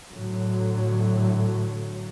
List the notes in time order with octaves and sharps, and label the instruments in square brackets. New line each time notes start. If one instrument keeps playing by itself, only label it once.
[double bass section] A2 D3 F#3